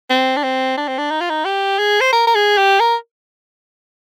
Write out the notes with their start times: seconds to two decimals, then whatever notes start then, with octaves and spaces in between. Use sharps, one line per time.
0.10 C4
0.37 D4
0.44 C4
0.77 D4
0.88 C4
0.98 D4
1.11 D#4
1.21 F4
1.30 D#4
1.45 G4
1.79 G#4
2.01 C5
2.13 A#4
2.27 A#4
2.35 G#4
2.57 G4
2.80 A#4